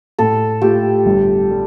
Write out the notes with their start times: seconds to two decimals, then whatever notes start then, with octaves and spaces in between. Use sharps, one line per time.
0.19 A2 A4
0.62 A3 F4 G4
1.06 G1
1.51 G3